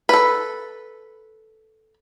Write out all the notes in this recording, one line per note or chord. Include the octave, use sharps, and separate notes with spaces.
A4 B4